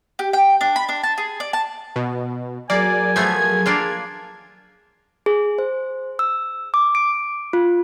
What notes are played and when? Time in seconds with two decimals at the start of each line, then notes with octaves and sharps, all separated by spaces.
0.19 G4
0.33 G5
0.61 D4
0.76 B5
0.89 D4
1.03 A5
1.18 G#4
1.40 D5
1.53 A5
1.96 B2
2.70 F#3 A#3 G#4 A#4 D5 G#5
3.16 F3 A3 B3 G#6
3.66 A#3 D4 F4 G#4
5.26 G#4
5.58 C5
6.19 E6
6.74 D6
6.95 D7
7.53 F4